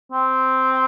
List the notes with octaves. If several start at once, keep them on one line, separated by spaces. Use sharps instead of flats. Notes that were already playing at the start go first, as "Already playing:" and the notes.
C4